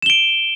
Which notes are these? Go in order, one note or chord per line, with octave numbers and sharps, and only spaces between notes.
D7 E7 G7